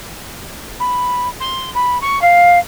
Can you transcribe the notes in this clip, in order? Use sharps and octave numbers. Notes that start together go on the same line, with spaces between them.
B5
C6
B5
C#6
F5